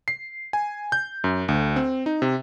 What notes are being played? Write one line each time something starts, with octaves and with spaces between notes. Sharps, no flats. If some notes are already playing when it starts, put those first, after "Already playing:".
C7
G#5
G6
F#2
D2
C4
D#4
C3